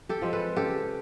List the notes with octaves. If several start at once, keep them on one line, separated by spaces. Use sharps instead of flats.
G4 A4
F3 G#3 C4
A4 B4
C#3 G4 A4